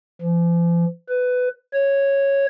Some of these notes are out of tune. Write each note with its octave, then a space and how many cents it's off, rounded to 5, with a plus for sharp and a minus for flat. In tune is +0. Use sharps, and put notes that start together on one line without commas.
F3 -45
B4 +15
C#5 -5